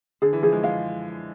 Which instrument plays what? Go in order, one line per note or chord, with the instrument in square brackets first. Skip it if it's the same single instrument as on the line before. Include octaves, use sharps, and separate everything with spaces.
[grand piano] D3 [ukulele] G#4
[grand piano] E3
[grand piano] F3 [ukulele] G#4
[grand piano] G#3
[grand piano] G#3 [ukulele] F5